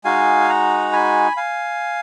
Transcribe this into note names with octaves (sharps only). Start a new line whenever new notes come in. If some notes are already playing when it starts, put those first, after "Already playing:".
G#3 D#4 F#4 F5 G#5
F#5 A#5
G#5 B5
F5 G#5